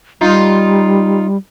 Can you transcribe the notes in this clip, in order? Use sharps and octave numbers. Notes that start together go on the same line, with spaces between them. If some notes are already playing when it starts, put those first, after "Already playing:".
G3 D#4 F4